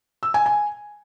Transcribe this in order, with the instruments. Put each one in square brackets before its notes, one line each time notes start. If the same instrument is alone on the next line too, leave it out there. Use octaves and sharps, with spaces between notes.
[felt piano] E6
G#5
G#5